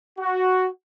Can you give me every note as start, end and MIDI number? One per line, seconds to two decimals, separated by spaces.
0.19 0.68 66